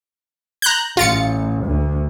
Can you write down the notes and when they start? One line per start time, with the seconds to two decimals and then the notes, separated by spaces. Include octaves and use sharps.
0.62 A#5 F#6 G6
0.97 A1 F4 A6 C#7
1.65 D2